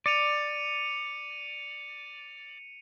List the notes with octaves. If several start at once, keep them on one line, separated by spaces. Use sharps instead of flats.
D5 C#7 D#7 F7